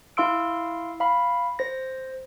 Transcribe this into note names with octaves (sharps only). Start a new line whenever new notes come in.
E4 F5 C6 E6 D7
F5 B5
C5 A#6